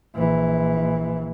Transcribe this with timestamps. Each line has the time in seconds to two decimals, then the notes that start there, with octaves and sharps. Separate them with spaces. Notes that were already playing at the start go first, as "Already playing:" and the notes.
0.15 A#1 E3